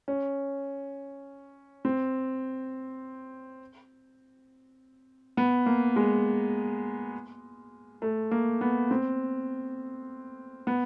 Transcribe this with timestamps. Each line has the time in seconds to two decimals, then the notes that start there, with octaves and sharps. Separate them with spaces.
0.08 C#4
1.85 C4
5.37 B3
5.66 A#3
5.96 G#3
8.02 A3
8.31 A#3
8.61 B3
8.91 C4
10.67 B3